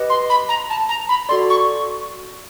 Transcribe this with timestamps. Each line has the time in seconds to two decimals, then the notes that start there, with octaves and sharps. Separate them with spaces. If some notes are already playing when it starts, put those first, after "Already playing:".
Already playing: G4 B4 D#5
0.10 C6
0.30 B5
0.49 A#5
0.70 A5
0.89 A#5
1.09 B5
1.29 F#4 A4 D5 C6
1.50 C#6